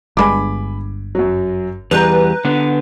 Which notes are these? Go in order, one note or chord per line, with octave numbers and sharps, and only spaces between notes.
G1 G2 G#3 G#5 B5 D6
F#2 F#3
E2 G3 B4 A#5 G6 F7
D3 B3